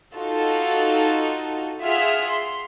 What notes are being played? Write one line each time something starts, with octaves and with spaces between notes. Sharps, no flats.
D#4 F4 F#4 A4
F4 G#4 E5 F#5 F6
C6